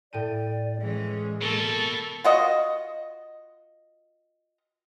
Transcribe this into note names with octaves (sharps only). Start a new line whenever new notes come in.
A2 D5 G5 D#7
E3 G#3 C#4
B2 A#3 A4 A#4
F4 F#4 D#5